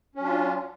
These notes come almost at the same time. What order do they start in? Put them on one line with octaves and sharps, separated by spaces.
C#4 F#3 D4 F4